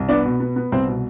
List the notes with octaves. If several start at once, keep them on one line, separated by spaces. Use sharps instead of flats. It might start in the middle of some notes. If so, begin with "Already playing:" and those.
Already playing: C2
B3 D4 D5
B2
B3
B3
C2 C4 C5
B2